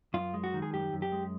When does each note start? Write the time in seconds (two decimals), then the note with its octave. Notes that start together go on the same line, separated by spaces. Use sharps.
0.14 F#2 F4
0.34 G#3
0.44 F#4
0.54 D#3
0.62 G#4
0.73 F#2 G4
0.93 F#2
1.02 G4
1.12 G#3